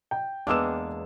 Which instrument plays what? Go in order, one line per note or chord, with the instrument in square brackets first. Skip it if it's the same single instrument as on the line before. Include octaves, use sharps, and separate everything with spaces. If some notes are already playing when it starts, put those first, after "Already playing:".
[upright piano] G5
[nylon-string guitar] E2 B3 [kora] G#3 A#3 D4 [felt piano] D6 E6 E7